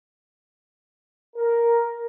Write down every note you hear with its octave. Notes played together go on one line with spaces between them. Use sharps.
A#4